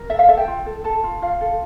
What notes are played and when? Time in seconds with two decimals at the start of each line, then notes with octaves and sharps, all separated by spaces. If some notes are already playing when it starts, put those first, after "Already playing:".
Already playing: A#4
0.09 A4 E5
0.19 F5
0.28 A4 E5
0.37 G5
0.48 F4
0.66 A4
0.84 A4 A5
1.04 F4
1.22 F4 F5
1.41 A4